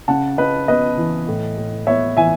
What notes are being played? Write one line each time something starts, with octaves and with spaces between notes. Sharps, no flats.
C#3 F#5 A5
C#3 B4 D#5
B3 B4 D#5
E3
A2
A2
B3 C#5 E5
E3 E5 G#5